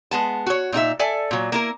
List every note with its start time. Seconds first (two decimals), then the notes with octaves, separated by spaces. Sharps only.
0.11 G#3 B3 A5
0.46 F#4 C#5
0.72 A#2 D#4 F#4 E5
0.99 A4 D5 E5 G#5
1.31 A#2 F#3
1.52 A#3 E4 A#4